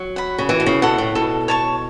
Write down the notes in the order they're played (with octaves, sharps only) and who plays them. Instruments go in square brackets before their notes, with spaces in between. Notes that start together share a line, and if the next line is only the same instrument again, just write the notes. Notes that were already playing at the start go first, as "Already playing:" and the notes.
Already playing: [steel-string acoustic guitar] F#3
[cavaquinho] F#5 B5
[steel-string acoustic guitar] C#3
[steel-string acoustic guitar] E3 [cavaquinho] F#4
[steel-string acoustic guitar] B2
C#3
[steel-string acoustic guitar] B2 [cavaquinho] A4 F#5
[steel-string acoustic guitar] A2
[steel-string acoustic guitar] B2 [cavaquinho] A4
[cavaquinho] C#5 A5 C#6